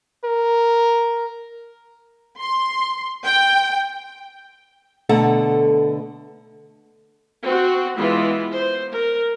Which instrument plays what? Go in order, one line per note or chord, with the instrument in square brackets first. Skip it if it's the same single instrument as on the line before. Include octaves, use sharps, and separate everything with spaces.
[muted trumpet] A#4
[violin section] C6
G5
[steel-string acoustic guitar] B2 D3 A3 A4 F#5 A#5
[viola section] C4 F#4 F#5
E3 G#3 B3 E4 F4
C5
A#4